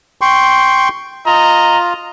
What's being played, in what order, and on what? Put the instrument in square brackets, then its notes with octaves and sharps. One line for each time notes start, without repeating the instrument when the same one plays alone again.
[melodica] G5 C6 C#6
[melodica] F4 [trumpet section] D#5 A#5